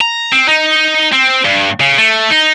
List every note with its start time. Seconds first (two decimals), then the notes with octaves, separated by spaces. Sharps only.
0.01 A#5
0.32 C4
0.48 D#4
1.13 C4
1.45 G2
1.81 C#3
1.98 A3
2.30 D#4